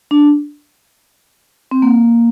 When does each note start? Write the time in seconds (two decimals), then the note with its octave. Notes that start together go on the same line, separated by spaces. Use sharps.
0.11 D4
1.71 C4
1.82 A#3